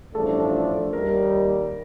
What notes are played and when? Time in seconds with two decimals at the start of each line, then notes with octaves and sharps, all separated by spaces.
0.14 A1 G2 F3 A3 D4 A4
0.93 D#2 D#3 G3 A#4